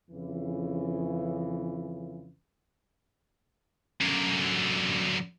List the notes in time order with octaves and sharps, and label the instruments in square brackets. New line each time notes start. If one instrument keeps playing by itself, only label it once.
[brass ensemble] F2 C#3 E3
[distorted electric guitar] F#2 D3